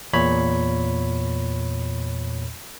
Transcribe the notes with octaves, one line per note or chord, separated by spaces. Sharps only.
E2 A#2 C#5 B5